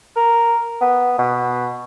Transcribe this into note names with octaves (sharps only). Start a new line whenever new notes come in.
A#4
B3
B2